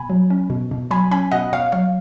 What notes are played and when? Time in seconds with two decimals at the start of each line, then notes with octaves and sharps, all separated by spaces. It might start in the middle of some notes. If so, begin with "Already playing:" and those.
Already playing: B2 G#5 B5
0.10 F#3
0.30 C#4
0.50 B2
0.71 B2
0.91 F#3 G#5 B5
1.11 C#4 G#5 B5
1.32 B2 D#5 F#5
1.52 B2 C#5 F5
1.72 F#3 C#5 F5